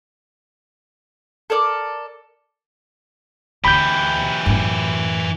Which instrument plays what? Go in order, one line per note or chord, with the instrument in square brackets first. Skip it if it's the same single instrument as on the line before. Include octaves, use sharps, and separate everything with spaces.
[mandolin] A4 A#4 D5 D6
[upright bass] D2 D3 [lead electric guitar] E3 G4 [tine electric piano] B5 G6
[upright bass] F#2 A2